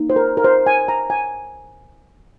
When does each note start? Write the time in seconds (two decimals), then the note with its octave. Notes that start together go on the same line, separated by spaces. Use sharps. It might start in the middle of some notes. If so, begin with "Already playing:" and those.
Already playing: A#3 D#4
0.10 C5
0.16 A#4
0.37 A#4
0.44 C5
0.66 G#5
0.88 A#5
1.10 G#5